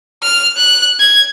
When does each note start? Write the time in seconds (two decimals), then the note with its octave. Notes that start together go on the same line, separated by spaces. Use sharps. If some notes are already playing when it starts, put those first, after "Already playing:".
0.23 F6
0.57 F#6
1.00 G#6